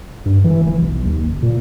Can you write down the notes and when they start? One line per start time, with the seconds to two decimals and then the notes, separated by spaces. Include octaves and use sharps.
0.25 G2
0.44 E3
0.62 F1
0.81 B1
1.05 D#2
1.23 F#1
1.42 A#2